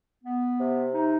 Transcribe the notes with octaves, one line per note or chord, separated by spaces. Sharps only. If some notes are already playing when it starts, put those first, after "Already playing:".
B3
C3
D#4